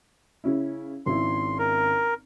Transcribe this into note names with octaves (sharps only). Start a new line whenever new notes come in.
C#3 C#4 E4
G#1 C#3 E4 C6
A#4